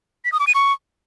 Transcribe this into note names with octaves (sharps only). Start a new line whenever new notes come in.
B6
D#6
D6
D#7
C#6